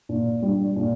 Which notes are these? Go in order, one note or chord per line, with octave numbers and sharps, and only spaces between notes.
A#2
G3 D4
A#2